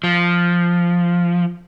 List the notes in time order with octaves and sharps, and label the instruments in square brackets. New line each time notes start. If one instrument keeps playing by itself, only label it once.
[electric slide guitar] F3